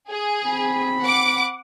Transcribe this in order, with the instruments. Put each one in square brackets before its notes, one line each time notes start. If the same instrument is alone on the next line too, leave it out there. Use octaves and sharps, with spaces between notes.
[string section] G#4
[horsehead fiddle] C4 B5
[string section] F#5 D6